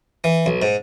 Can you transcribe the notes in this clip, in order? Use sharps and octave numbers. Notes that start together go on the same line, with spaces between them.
E3
B1
G#2